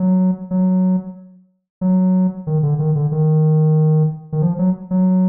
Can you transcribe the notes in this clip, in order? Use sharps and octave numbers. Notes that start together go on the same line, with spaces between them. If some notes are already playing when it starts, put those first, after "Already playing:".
Already playing: F#3
F#3
F#3
D#3
D3
D#3
D3
D#3
D#3
F3
F#3
F#3